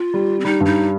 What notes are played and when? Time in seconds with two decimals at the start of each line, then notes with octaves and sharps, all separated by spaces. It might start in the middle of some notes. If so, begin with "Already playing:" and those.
Already playing: F4
0.14 G3
0.40 C4
0.45 G3 D#4
0.61 G2
0.66 D#4